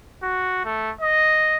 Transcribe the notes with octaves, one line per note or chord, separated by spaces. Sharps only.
F#4
A3
D#5